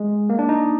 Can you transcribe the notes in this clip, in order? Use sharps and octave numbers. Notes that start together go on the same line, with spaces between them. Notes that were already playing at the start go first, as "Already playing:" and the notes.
Already playing: G#3
A#3
D4
D#4